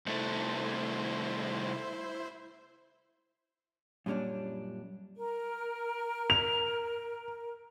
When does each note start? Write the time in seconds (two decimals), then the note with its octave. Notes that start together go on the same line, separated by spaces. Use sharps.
0.06 C2 A3 E4 C5
4.06 F#2 A#2 G3 C#4 D4
5.16 A#4
6.30 F7